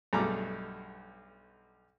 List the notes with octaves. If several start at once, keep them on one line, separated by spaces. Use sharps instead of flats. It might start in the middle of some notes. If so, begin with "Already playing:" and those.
B1 G2 A3 G#4 A#5 D6